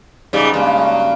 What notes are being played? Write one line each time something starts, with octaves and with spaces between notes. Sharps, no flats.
G#2 C#3 G3
G2 G#3 A#3
F#3